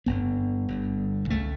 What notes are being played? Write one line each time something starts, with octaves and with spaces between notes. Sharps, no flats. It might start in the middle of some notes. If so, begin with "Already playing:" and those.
G1 G2 D3 B3
G1 G2 D3
C#2 C#3 A3